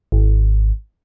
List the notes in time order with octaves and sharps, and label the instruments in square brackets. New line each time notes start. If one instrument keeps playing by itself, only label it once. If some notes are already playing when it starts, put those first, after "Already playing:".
[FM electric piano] G#1